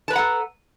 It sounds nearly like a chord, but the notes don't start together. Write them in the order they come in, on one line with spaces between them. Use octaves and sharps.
A5 B4 A#5 F#5 A4